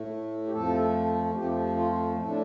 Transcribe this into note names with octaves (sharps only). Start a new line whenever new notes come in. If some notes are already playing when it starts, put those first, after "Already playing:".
Already playing: A2 A3
G4
F2 F3 A3 A4
F2 F3 A3 G4
F4
A2 A3
D4